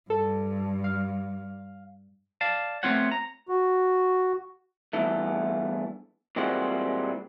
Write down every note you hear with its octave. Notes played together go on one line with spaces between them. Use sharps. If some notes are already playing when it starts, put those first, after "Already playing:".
G2 A4
F5
D5 F5 A5
A3 B3 C4 F4 C#5 F#5
A#5
F#4
E2 G2 E3 A3
A#2 E3 G3 G#3 C4 F#4